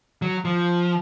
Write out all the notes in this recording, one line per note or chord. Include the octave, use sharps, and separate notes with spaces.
F#3
F3